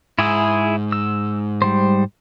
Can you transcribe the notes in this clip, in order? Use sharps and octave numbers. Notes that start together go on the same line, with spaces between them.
G#2 E4 G#4 E6
E6
G3 C5